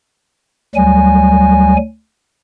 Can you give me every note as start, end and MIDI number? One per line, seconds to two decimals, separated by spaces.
0.75 1.76 38
0.75 1.76 54
0.75 1.76 55
0.75 1.76 80